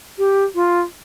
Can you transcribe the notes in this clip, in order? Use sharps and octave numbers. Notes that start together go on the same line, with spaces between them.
G4
F4